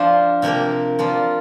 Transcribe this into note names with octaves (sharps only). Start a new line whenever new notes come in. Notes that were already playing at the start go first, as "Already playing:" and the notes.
Already playing: F3 D4 F4 C5
C3 F3 A#3 G4 A#4
F3 A#3 F4 D5